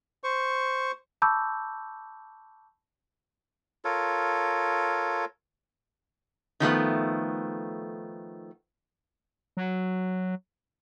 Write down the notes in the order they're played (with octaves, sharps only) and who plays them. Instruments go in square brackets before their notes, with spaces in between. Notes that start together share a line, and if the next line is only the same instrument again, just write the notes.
[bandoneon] C5 C#6
[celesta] A5 B5 C#6 D6 E6 G6
[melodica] F4 A4 A#4 C#5
[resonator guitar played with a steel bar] D#3 F3 A3 B3
[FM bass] F#3